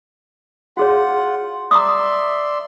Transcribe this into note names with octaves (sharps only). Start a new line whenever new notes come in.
F4 F#4 G#4 C#5 F#5
D5 E5 A#5 C6 D6 D#6